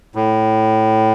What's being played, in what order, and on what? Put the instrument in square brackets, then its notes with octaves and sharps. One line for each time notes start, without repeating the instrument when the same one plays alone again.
[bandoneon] A2